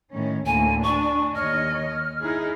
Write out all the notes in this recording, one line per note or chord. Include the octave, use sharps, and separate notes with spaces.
A2 D#3 C#4
D2 A2 A#3 G#5
D4 C#6
D#2 C#5 D#5 F6
D#4 E4 G#4